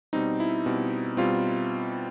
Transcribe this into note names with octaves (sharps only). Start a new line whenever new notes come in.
B2 G3 C4 D#4
E4
B2 G3 C4
B2 G3 C4 F4